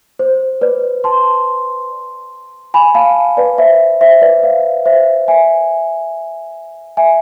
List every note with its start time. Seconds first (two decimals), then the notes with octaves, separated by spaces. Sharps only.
0.19 C5
0.61 B4 D5
1.04 A5 C6
2.74 G#5 B5
2.95 F5 A5
3.37 B4 D5
3.58 C5 E5
4.01 C5 E5
4.22 B4 D5
4.43 D5 F5
4.85 C5 E5
5.28 E5 G#5
6.97 E5 G#5